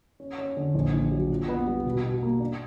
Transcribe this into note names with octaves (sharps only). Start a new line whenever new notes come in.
C#4
C#4
D3
A#1
A#1
F#3
A#2
B3
G3
B2
B2
A#3
D4